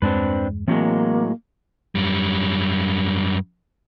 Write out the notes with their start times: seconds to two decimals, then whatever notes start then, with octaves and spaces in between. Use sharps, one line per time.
0.02 E2 G2 G#3 C4 D4 B4
0.68 A2 E3 F#3 G#3 A#3 C4
1.95 F#2 G3